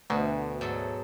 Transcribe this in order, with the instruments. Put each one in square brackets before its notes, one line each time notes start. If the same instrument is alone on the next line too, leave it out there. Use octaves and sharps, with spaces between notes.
[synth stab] D2 [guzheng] B2
[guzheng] G#2 F#3 A4